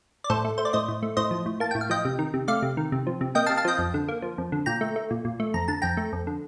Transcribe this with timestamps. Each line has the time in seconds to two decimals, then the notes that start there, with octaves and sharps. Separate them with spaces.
0.24 D5
0.30 A2 A4 C5
0.45 A3
0.58 A3 C5
0.65 D5
0.73 A2 C5 D#5
0.88 A2
1.03 A3
1.17 A2 C5 D#5
1.31 F3
1.46 A2
1.60 A#3 A5
1.71 A2 G5
1.81 F5
1.90 F3 D#5 G5
2.05 C3
2.19 D#3
2.34 C3
2.48 A3 D5 F5
2.62 C3
2.77 D#3
2.92 C3
3.07 F3
3.21 C3
3.35 A#3 D#5 G5
3.46 F5 A5
3.50 C3
3.57 F5 A5
3.65 F3 D#5 G5
3.79 F2
3.94 D3
4.08 A#3
4.22 F3
4.38 F2
4.52 D3
4.66 A#2 G5 A#5
4.81 A3
4.96 A3
5.11 A#2
5.25 A#2
5.40 A3
5.54 F2 A#5
5.68 D3 A5
5.82 F2 G5 A#5
5.97 A3
6.13 F2
6.27 D3